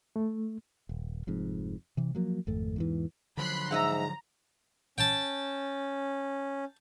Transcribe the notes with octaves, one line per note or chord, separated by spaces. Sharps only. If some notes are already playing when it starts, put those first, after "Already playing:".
A3
D#1
F1 F2 G#2
C3 E3
F3 F#3 A#3
G#1 F2 A3
E2 G#2 E3
D3 F3 F#3 B5 C6 F#6
G#2 D#5 E5 F#5 A#5
C#4 G5 A5